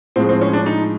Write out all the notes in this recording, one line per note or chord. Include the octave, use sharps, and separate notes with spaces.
A2 F3 G#3 C4
C4
C#4
D4
D#4